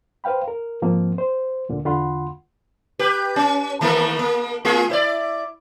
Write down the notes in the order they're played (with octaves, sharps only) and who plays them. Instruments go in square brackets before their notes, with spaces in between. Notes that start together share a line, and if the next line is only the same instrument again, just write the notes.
[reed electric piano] B4 C5 F5 G5 B5
A#4
G#2 F3 A#3 C4
C5
D2 A#2 D3
E2 D3 F4 F#5 B5 C6
[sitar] G4 B4
C#4
D#3 A3 A#3
A#3
A3 F4 G#4
E4 C5 D5